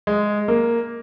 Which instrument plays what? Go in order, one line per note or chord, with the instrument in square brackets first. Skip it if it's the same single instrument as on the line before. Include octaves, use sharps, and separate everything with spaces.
[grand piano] G#3
A#3